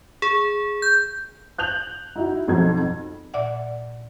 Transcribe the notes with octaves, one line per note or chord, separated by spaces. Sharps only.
G#4
G6
F#6 G6 F7 F#7
D#4 E4 F#4
B1 F2 F#3 C4 D#4 G#6
A#2 D5 E5 F#5